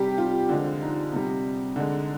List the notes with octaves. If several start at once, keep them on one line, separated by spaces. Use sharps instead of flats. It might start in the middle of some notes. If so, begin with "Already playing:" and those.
Already playing: C3 G3 G4
F4
D3 F3 G#3
D#4
C3 G3
D3 G#3